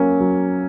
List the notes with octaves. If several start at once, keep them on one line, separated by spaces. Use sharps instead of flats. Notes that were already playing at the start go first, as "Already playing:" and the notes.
Already playing: F#3 A#3 C#4
F#3